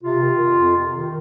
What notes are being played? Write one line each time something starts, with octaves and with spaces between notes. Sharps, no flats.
C3 F4
D#3
F2
F2
C3
D#3